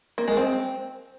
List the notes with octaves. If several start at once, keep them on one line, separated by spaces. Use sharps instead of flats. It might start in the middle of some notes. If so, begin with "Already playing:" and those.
A#3
G#3
C4